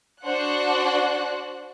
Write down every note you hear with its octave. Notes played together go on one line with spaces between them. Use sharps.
D4 F#4 C5 F#5 F#6